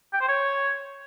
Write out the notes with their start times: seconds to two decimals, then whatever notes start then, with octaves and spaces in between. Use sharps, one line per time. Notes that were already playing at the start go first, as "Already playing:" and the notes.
0.13 G5
0.21 C5
0.28 C#5